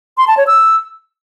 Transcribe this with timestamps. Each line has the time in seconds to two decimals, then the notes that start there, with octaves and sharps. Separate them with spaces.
0.17 C6
0.27 A5
0.37 C#5
0.47 E6